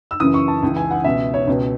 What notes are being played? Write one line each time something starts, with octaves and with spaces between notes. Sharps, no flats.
E6
F#2 C#3 E3 D#6
C#6
A5
C#2 C#3 E3
G#5
F#5
C#2 B2 E5
C#5
C#2 B2